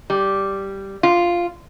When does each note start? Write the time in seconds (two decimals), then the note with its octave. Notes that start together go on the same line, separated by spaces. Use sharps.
0.10 G3
1.03 F4